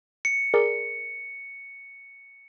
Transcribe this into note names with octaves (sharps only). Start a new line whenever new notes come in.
C#7
G#4 A#4 D5